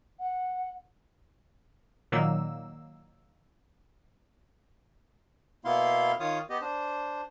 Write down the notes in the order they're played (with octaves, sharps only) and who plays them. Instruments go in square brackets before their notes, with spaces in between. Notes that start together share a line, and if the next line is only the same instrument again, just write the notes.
[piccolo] F#5
[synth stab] A#2 D#3 F#3 A#3 E6
[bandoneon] B2 A#3 B3 E4 F5 C6
D#3 F4 C#5 F5 D#6
B3 G4 D#5
D4 C5